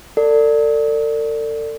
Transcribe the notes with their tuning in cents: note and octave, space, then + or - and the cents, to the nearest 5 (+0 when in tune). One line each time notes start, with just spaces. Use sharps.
A4 +40 D5 +0